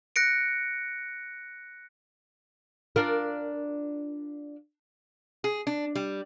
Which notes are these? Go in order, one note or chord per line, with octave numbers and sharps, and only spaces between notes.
F#6 A#6 C#7 D7
D4 F4 A#4
G#4
D4
G3